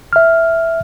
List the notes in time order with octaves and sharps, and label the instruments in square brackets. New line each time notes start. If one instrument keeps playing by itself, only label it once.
[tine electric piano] E5 F6